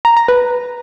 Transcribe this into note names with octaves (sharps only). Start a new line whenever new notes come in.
A#5
A#5
B4